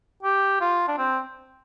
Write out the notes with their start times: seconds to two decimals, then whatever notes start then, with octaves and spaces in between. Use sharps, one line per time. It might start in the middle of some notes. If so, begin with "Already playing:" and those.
0.22 G4
0.61 F4
0.88 D4
0.98 C4